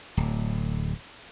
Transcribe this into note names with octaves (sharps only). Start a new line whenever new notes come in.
D1